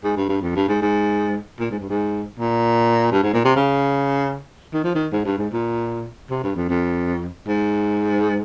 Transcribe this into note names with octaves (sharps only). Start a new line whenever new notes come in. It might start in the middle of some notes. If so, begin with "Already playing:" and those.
G#2
G2
G2
F2
G2
G#2
G#2
A#2
G#2
G2
G#2
A#2
G2
G#2
A#2
C3
C#3
D#3
F3
D#3
G#2
G2
G#2
A#2
C3
G2
F2
F2
G#2